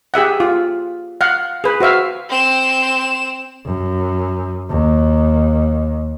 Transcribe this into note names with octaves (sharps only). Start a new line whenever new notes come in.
G4 G#4 E5 F#5
F4
F5 F#5
G#4 B4
F#4 C5 E5 F5
C4 E7
F#2
D#2